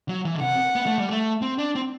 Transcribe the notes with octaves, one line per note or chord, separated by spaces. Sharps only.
F#3
E3
D3
C3 F#5
B3
A3
G3
A3
C4
D4
C4